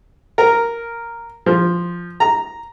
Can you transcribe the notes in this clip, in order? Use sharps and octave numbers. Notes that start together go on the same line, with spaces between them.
A#4
F3
A#5